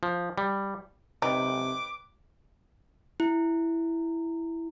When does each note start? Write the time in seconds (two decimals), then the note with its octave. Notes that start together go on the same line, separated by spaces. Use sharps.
0.03 F3
0.38 G3
1.22 C3 D#4 B4 C#5 G5 D6
3.20 E4